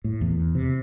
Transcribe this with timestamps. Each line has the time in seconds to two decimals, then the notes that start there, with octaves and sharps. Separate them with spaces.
0.04 A2
0.21 E2
0.55 C3